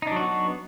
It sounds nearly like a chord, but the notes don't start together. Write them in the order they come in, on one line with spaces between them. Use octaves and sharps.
D#4 D4 F#3 F#4 B3